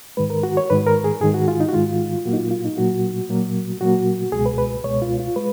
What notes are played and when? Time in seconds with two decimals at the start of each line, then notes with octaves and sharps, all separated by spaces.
0.17 G#2 D#3 G#3 B4
0.30 A#4
0.43 F#4
0.57 C#5
0.70 G#2 D#3 G#3 B4
0.86 A#4
1.04 G#4
1.21 G#2 D#3 G#3 G#4
1.34 F#4
1.48 F4
1.60 D#4
1.69 F#4
1.73 G#2 D#3 G#3 F4
2.25 A#2 F#3 A#3 F#4
2.33 D#4
2.38 F4
2.51 F4
2.65 D#4
2.77 A#2 F#3 A#3 F#4
3.29 A#2 F#3 A#3
3.81 A#2 F#3 A#3 F#4
4.32 C#2 B2 G#3 G#4
4.46 B4
4.58 B4
4.84 C#2 B2 G#3 C#5
5.02 F4
5.19 F4
5.36 G#3 B4